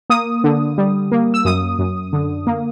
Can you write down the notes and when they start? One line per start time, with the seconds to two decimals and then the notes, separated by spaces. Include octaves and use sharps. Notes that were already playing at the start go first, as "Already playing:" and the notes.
0.10 A#3 D#6
0.44 D3
0.78 G3
1.12 A#3
1.34 E6
1.45 F#2 D#6
1.79 F#2
2.13 D3
2.47 A#3